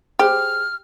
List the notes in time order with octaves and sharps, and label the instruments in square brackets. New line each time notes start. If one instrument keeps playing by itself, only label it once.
[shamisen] G4 [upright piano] G#4 C5 [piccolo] F6